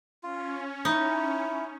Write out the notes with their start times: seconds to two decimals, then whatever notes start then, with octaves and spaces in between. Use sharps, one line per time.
0.23 C#4 F4
0.85 D#4 E4